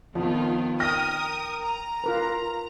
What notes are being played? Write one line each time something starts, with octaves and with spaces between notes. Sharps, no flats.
F2 D#3 F3 B3 F4
A#4 G5 D#6 F6 A#6
A#5
F4 A#4 B4